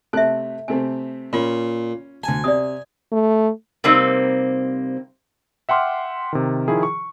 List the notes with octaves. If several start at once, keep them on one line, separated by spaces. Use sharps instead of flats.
C3 A3 E5 A5 F#6
C3 A3 C4 G#5
A#2 C#4 F4 B5
D2 G#5 A5
C3 D5 D#6
A3
C3 G3 A#3 C4 D#4
E5 F#5 G5 C6 D6 F6
C3 D#3
D#3 F3 E4 G#4
C#6